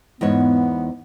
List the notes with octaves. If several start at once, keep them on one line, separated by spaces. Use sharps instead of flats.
E2 G#2 B3 C#5